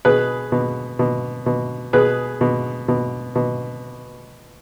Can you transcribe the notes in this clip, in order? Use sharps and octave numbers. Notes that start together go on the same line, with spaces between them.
B2 G#4 B4
B2
B2
B2
B2 G#4 B4
B2
B2
B2